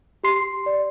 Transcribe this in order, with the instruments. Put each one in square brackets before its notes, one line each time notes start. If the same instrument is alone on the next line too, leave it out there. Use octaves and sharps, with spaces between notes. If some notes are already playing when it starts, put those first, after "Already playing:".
[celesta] G4 C6 C7
D5